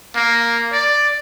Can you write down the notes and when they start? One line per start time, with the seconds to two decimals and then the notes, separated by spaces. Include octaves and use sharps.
0.16 A#3
0.72 D5